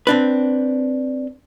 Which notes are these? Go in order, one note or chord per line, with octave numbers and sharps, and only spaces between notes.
C4 D4 B4